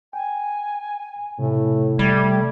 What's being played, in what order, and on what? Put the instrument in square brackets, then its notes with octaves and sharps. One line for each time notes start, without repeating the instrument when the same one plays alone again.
[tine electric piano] G5 [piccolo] G#5
[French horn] A2 [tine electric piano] C3
[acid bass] G3 [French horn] A3 [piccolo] G#6